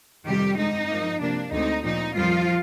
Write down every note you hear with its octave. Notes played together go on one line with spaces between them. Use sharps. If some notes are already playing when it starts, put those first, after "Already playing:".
F2 C3 D#3 G3 G4
G2 D3 G#3 C4 D#4
G#2 F3 A#3
C3 F3 A#3 D4
D2 D3 G#3 C4 D#4
A#2 F3 C4 D#4
F2 D#3 F3 G3 F4